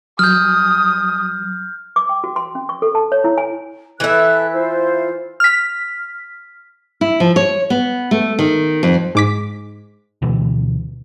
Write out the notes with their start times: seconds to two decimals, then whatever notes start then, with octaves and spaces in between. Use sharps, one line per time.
0.19 F#3 D#6 F6 G6
1.96 D6
2.09 G5
2.24 F#4
2.36 C6
2.55 C#4
2.69 C#6
2.82 A4
2.95 A5
3.12 C#5
3.24 E4
3.38 G#5
4.00 E3 A4 B4 E5 F#6
4.53 E4 F4 C5
5.40 F6 B6
7.01 E4
7.20 F3
7.36 C#5
7.70 B3
8.11 A3
8.39 D#3
8.83 F2
9.15 G#2 D6 B6
10.22 D2 B2 E3